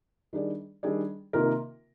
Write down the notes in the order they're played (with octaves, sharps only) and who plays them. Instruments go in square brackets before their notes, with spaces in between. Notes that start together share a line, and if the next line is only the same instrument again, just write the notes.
[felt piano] D#3 G3 D4 G#4 D5
D#3 G3 D4 G#4 D5
C3 D#3 A#3 F4 A#4